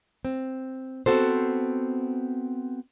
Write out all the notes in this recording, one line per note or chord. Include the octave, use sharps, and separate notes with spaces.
C4
B3 C4 F#4 A4 C5